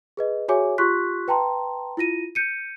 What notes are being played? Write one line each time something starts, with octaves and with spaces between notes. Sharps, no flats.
G#4 B4 D#5
F#4 G#4 C#5 E5 G#5 D6
F4 G4 C6 C#6 F#6 B6
B4 G5 A5 A#5 C6
E4 F4 A#6 D#7
G6 C#7 D#7